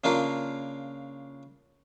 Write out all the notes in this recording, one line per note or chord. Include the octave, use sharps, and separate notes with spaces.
C#3 A#3 D4 F4 A#4